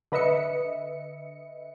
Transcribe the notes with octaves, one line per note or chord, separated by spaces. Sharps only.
D3 B4 D#5 E5 C#7